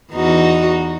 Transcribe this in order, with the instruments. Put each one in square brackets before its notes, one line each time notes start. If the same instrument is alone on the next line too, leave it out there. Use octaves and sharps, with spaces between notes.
[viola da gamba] E2 D#4 F#4